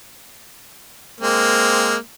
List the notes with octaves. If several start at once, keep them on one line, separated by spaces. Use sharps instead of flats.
G#3 A#3 C4